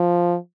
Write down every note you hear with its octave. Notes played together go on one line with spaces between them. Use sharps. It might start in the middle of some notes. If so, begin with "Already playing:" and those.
Already playing: F3